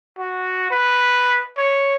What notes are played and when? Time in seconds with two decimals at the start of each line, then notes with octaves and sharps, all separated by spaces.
0.18 F#4
0.71 B4
1.57 C#5